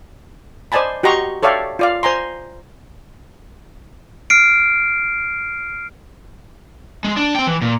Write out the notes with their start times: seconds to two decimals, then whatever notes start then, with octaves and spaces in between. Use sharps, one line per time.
0.72 C5 D5 D#5 G#5 A5 B5
1.03 F#4 G4 D#5 A#5 C6 C#6
1.43 A4 C#5 D5 E5 F5 G5
1.79 F4 D5 F5
2.03 C5 G#5 A#5 C6
4.30 F6 C7 D7
7.04 G#3
7.17 D4
7.35 C4 G5
7.47 E3
7.62 A#2